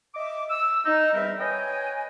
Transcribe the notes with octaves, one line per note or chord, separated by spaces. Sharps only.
D#5 E5 D6
E6
D#4
E2 G3 C4 A#4 E5
B4 C#5 D#5 G5 G#5